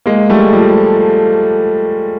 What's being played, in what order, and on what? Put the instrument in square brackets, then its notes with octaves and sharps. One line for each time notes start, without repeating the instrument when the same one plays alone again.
[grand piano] G#3 A#3
G3 A3
F3 G3